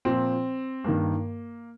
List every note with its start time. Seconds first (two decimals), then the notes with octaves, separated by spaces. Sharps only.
0.05 A#2 F3 C4
0.84 G2 D#3 A#3